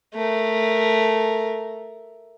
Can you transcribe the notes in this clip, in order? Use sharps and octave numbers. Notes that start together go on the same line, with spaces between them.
A3 A#4